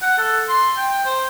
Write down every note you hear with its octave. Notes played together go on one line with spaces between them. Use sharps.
F#5
A4
C6
G5
C5